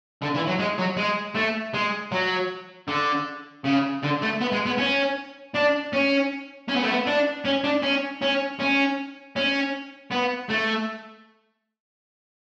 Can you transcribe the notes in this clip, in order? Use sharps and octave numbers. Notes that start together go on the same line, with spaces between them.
D3
E3
F#3
G#3
F#3
G#3
A3
G#3
F#3
D3
C#3
D3
A3
B3
G#3
B3
C#4
D4
C#4
C#4
B3
A3
B3
D4
C#4
D4
C#4
C#4
C#4
C#4
B3
A3